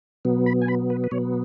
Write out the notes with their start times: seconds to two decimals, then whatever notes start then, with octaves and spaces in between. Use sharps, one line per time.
0.25 B2 F#3 B3
0.46 B5
0.61 G#5
0.68 B5
0.90 B4
1.04 B4
1.11 B2 F#3 B3 C#5